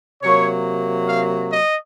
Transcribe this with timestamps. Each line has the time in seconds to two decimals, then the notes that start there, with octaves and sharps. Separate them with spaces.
0.23 C3 F#3 A#3 C#5
1.08 F5
1.51 D#5